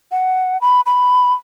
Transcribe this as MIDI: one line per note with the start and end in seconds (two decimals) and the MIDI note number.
0.12 0.60 78
0.61 0.81 83
0.86 1.33 83